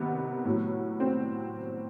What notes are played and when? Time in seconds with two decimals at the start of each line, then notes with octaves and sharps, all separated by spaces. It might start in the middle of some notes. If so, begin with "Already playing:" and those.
Already playing: C3 D#3 B3
0.45 A2 F#3
1.00 C4